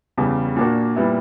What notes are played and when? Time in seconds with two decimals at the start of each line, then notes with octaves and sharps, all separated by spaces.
0.18 E2 C#3 G3
0.56 A#2 A#3 D4 F#4
0.96 A#2 G3 B3 E4